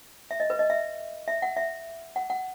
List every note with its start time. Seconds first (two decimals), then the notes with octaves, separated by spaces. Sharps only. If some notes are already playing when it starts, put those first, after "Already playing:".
0.31 E5
0.40 D#5
0.50 B4
0.59 D#5
0.70 E5
1.28 E5
1.42 F#5
1.56 E5
2.16 F#5
2.30 F#5